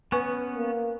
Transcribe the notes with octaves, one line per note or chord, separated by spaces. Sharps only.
B3 C#4 B4 G#5 C#6
A#3